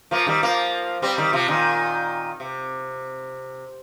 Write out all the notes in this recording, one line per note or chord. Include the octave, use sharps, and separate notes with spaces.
F3 A#3
D#3 G3
F3 A#3
G3 C4
D#3 G3
C3 F3
A#2 D#3
C3